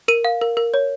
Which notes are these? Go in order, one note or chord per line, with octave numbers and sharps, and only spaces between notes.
A#4 D#7
F5
A#4
A#4
C#5